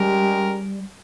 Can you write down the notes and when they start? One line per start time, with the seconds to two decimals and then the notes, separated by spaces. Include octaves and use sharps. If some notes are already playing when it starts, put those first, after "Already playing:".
Already playing: G3 G#3 C#4 G4 A#4